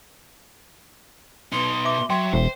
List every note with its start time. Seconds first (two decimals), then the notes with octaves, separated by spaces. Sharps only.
1.52 B2 D#4 C6
1.85 E5 D6
2.10 F#3 E5 G5 C6
2.33 E1 C5